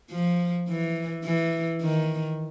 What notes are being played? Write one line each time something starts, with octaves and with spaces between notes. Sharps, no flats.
F3
E3
E3
D#3